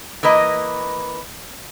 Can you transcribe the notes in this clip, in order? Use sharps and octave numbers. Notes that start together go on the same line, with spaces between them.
E3 A#3 B4 D#5